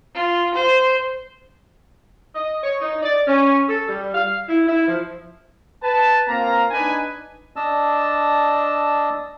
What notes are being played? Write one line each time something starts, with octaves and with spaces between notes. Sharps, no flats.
F4
C5
D#5
C#5
D#4
D5
C#4
A4
G3
F5
E4
E4
F3
B4 A5
A#3 C4 F4 A#5
D4 D#4 B4 G#5
D4 D#5 A5 E6